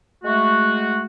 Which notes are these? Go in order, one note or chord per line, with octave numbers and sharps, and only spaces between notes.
G#3 A3 F#4